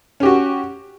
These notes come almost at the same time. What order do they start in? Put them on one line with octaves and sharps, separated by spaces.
C#4 G4 F#4